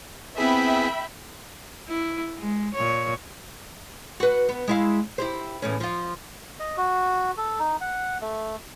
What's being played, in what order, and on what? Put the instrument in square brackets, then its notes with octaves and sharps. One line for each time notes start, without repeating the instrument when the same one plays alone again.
[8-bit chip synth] B3 E4 G#4 [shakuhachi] C4 [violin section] E5 G5 B5
[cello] E4
G#3
A#2 C#5
[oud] F#4 B4
B3
G#3 E4 F5
E4 G4 C5
E2 A2 C#4
F3 F4
[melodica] D#5
F#4
A4
D#4
F#5
A3